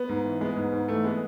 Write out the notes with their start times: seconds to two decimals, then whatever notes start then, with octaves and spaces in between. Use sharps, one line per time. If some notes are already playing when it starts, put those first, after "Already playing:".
Already playing: B3
0.09 G#2
0.24 E3
0.41 G#3 B3
0.57 G#2
0.72 G#2
0.88 E3 A3
1.04 G#3 B3